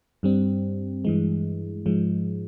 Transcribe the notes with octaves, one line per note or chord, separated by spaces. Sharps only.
G2 G3 C4
G2 E3 G#3
G#2 F3 G#3